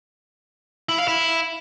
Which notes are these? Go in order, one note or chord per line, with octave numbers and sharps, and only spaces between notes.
E4
F5
E4